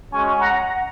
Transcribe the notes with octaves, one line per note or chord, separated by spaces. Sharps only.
G#3 C#4 F#4 G#5 C#6
F#5 A#5